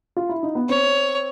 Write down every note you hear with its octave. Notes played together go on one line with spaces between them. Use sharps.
F4
E4
D#4
B3
C4 C#5